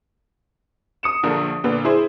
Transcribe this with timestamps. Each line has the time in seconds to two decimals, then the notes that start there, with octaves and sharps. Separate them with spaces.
1.03 D#6 C#7 E7
1.23 A#1 D3 F3 A#4
1.64 A#2 D3 B3
1.85 E4 G#4 C5